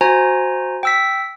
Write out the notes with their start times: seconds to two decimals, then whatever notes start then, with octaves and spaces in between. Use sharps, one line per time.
0.01 F#4 C5 G#5 A#5
0.83 G5 E6 B6